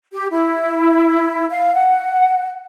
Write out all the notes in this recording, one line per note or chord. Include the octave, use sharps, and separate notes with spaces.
G4
E4
F5
F#5